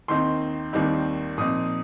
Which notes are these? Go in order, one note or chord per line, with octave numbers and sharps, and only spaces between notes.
D#2 D#3 C4 D#4 C6
D#2 D#3 G3 C4 D#4
A#2 F3 C4 D#4 D#6